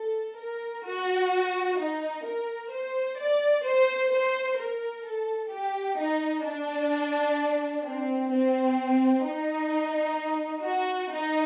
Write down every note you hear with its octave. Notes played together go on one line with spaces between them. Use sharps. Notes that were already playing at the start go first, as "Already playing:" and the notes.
Already playing: A4
A#4
F#4
D#4
A#4
C5
D5
C5
C5
A#4
A4
G4
D#4
D4
C4
C4
D#4
F#4
D#4